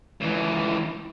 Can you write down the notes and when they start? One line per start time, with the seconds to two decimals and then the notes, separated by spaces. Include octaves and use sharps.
0.21 C#2 E3